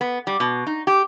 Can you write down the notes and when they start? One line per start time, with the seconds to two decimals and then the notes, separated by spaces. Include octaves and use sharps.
0.01 B3
0.27 G3
0.40 B2
0.67 D#4
0.87 G4